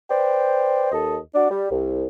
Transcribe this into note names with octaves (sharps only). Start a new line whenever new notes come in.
B4 C5 D5 G5
D#2 A4 D#5
D4 F#4 D5
G3
C2